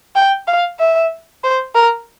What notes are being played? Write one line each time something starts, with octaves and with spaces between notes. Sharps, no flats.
G5
F5
E5
C5
A#4